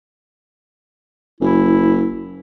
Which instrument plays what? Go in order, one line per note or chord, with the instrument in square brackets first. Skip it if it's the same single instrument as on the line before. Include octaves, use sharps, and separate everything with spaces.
[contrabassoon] F#1 [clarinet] E4